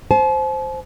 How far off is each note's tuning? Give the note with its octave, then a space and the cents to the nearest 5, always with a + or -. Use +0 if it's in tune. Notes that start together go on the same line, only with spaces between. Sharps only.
C5 +0 A5 -45